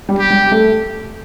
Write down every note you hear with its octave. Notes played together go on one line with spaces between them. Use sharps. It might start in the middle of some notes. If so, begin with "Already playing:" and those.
G3
G4
G3
A3